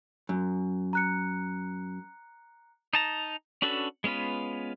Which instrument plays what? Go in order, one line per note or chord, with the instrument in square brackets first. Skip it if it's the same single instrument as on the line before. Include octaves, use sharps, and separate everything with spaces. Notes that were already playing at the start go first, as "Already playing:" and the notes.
[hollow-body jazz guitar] F#2
[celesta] A#5 F#6 C#7
[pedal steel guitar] D#4 A5 A#5
C#4 D4 F#4 A4 B4
G#3 B3 C#4 F4 B4